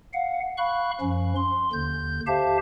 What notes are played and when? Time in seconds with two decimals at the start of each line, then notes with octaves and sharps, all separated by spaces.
0.14 F5 F#5
0.58 F5 B5 C#6 F#6
1.01 F#2 F3 C#4
1.36 C6
1.73 D#2 D3 G6
2.27 G4 C5 E5 F5 A5